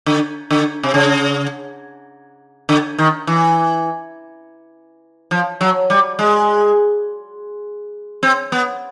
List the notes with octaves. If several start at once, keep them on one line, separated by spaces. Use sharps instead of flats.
D3
D3
C3
C#3
D3
D#3
E3
F3
F#3
G3
G#3
C4
B3